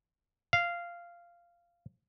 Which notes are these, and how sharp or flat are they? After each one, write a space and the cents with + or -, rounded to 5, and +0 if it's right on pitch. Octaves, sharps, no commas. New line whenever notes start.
F5 -10